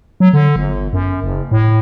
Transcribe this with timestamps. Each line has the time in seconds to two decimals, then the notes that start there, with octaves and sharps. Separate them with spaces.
0.20 F#3
0.33 D3
0.56 G1
0.93 F#2
1.23 F#1
1.51 A2